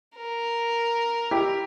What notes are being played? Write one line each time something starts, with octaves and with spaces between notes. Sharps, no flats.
A#4
E4 G4